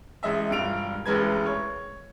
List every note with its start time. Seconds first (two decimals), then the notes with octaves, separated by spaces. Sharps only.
0.23 A1 G#3 D#5 E5
0.50 E1 G2 F4 D7 F7
1.06 E1 A1 G#3 B4 G#6
1.46 C#5